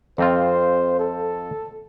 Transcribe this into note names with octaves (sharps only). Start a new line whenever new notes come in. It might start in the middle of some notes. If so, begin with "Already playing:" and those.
F2 C4 F4 C5
A4